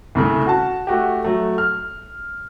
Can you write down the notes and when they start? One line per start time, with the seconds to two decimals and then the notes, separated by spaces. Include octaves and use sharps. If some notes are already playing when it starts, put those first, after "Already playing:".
0.15 C2 C#3 A3
0.47 F#4 A5
0.87 A3 F#4 G4
1.24 F#3 A3
1.58 F6